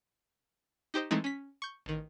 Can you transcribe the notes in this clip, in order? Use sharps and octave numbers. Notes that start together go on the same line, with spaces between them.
D#4 G4 C5 D#5
E3 G#3 A3 C4 D#4
C#4 B6
C#6 G6
A1 D#3